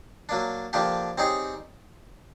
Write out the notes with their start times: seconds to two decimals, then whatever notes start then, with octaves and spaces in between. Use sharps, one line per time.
0.29 F#3 A#3 D4
0.73 D3 F3 A#3 D4 G4
1.18 G3 C4 D#4 G#4 C#5